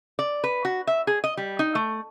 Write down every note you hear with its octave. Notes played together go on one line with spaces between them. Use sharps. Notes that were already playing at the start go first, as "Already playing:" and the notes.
D5
B4
F#4
E5
G#4
D#5
G3
D#4
A3